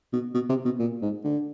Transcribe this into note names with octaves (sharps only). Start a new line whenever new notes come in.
B2
B2
C3
B2
A#2
G#2
D3